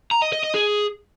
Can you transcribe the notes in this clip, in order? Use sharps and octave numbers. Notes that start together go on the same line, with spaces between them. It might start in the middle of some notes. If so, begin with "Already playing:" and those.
A#5
D#5
D#5
D#5
G#4